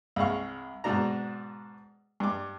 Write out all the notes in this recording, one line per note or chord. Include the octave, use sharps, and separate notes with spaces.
C2 G#3 F5 C#6
G#2 B2 D4 A#5
G2 D6